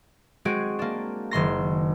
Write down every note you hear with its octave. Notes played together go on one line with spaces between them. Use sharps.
G#3 C4 F#4 G#4 D7
A#3 D4
F#1 D#3 C6 A#6